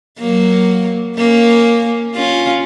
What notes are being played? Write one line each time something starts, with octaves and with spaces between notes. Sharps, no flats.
F#3 A#3
A#3 C#4
C#4 F4